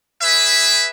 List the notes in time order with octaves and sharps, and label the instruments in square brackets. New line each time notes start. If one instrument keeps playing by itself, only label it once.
[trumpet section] G#4 B4 E5